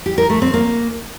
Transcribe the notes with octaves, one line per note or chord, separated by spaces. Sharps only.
G4
A#4
A3
C4
A#3